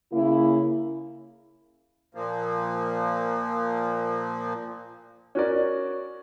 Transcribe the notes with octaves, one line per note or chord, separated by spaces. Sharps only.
C#3 A#3 E4
A#2 F3 A#3
C#4 F#4 A#4 D5